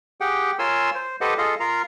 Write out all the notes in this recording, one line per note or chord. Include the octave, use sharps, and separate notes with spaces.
G4 G#4 F#5 G5
F4 A#4 C#5 G#5 C6 E6
C5
G4 A4 B4 C5 D#5 F#5
F4 G#4 A4 D#5 F5
F4 A#4 F5 A#5